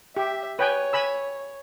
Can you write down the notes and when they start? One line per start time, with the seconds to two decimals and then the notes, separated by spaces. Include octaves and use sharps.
0.17 G4 E5
0.59 B4 C#5 G5 G#5
0.93 G#5 B5 E6